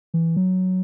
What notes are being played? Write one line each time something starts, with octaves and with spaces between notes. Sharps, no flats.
E3
F#3